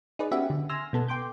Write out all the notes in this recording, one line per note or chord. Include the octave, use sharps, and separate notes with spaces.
D#4 G#4 B4 D5
B3 C#4 F#4 G4 E5
D3
G#5 C6 E6 F6 A#6
B2 B3 A4
G5 C6 D6 G6